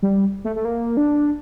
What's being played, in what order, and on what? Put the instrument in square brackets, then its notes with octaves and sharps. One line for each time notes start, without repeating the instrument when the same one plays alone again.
[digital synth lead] G3
A3
A3
A#3
D4